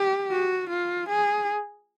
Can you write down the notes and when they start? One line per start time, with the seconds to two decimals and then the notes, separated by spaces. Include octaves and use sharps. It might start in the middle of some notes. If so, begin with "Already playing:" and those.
Already playing: G4
0.31 F#4
0.69 F4
1.09 G#4